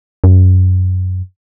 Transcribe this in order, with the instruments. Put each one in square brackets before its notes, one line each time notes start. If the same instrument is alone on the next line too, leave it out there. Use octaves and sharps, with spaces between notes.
[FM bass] F#2